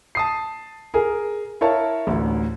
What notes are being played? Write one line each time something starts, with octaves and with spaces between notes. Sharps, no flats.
A5 D#6 C7
G#4 A#4
E4 A#4 C#5 F5 A5
A1 D2